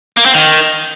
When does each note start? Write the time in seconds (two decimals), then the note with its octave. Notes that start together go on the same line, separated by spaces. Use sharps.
0.17 A#3
0.26 C4
0.34 D#3